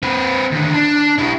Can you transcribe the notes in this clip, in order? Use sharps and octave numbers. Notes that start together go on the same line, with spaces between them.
C4 B4
D#2 D3
D4
E4 G4